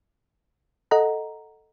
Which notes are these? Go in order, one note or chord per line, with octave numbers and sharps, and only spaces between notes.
A4 D#5 F#5 A#5